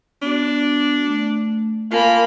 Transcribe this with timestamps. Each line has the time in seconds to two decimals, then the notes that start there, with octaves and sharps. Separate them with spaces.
0.22 B3 D4 F#4
1.06 A3
1.92 A#3 F4 A#4 G#5 A5 B5